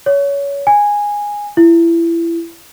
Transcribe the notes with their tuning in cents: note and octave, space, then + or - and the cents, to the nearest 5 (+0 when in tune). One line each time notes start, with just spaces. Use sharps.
C#5 +25
G#5 -10
E4 +25